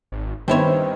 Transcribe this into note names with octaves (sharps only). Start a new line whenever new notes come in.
G#1
G2 D#3 B3 C4 D#4 E4 C5 C#5